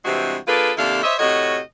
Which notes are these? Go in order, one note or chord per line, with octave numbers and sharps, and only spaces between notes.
G2 C3 E3 G#3 C4 F#4
A#3 D4 F4 G#4 A4 B4
D#2 C3 D4 E4 A4 F5
C5 C#5 D#5 E5
A2 C3 F#4 C#5 D#5